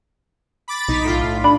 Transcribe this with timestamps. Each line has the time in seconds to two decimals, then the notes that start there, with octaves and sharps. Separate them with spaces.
0.68 B5 D6 A6
0.89 B1 D#4 B6
1.04 A2 F4
1.44 D4 B5